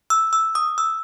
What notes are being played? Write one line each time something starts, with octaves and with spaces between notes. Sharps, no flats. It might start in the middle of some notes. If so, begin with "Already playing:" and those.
E6
E6
D#6
E6